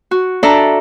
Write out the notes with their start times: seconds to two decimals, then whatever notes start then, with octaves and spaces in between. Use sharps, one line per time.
0.11 F#4
0.43 D4 A4 D5 E5 A#5